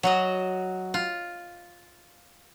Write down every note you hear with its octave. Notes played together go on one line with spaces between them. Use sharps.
F#3 F#4 D#5
F4